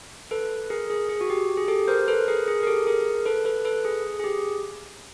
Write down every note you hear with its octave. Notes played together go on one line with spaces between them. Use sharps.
A4 B4
G#4 A#4
G#4
G#4
F#4
G4
G#4
G4 A4
A#4 C5
A4 B4
G#4 A#4
G#4
A#4
G4 A4
G#4 A#4
A4 B4
A4 B4
A4 B4
G#4
G#4
G4